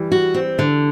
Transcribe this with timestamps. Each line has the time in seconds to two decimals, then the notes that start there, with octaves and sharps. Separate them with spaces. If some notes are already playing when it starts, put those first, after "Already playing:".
Already playing: E3 G3
0.12 F#4
0.34 C4
0.59 D3